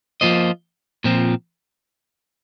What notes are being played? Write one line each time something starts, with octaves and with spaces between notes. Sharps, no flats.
F3 A#3 F4 C5 D#5
A#2 F3 C4